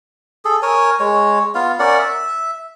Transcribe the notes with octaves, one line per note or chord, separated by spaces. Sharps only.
G#4 A4
A#4 C#5 G#5
G#3 C#5
B3 F4 F5
C#4 A#4 D5 F#5
E5